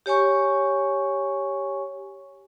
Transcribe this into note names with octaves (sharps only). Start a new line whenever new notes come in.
G4 C#5 G#5 C#6